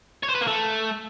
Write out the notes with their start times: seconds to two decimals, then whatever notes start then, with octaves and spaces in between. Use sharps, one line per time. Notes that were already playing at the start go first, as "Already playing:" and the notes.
0.23 C#5
0.29 C5
0.35 B4
0.41 A#3
0.47 A3